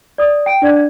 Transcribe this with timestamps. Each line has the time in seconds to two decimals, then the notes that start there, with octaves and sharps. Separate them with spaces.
0.18 D5 D#6
0.46 G5 D7
0.62 D4 D5 F#5 G#6